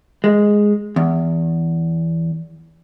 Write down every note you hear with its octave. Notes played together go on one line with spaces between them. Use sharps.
G#3
E2